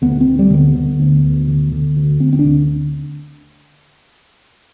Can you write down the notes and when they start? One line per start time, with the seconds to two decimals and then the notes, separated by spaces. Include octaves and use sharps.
0.02 D2 B3
0.21 C4
0.27 D2
0.39 G3
0.50 D3
0.57 B3
0.75 D3
1.00 D2
1.24 D2
1.48 D3
1.72 D3
1.96 D2
2.20 D2 C4
2.33 C4
2.39 D4
2.45 D3